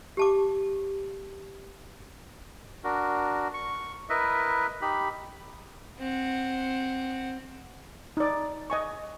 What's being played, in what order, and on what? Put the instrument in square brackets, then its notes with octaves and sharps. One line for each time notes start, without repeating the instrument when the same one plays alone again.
[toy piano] G4 A5 D6
[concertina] D4 F#4 A#4
C#6
E4 A#4 B4 D#5 E5
D#4 G4 B5
[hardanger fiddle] C4 F#5
[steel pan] D#4 D5
D#5 G#5 C#6